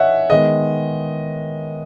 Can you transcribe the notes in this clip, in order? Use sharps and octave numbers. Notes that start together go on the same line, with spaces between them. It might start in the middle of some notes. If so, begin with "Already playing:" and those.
Already playing: E3 C#5 D#5 E5 F#5 G#5
D#3 G#3 B3 D#5